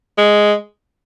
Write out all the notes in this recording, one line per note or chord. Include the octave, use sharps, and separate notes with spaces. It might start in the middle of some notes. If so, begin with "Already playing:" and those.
G#3